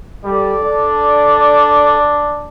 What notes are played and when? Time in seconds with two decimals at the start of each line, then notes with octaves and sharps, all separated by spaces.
0.24 G3 A4 D5
0.61 D4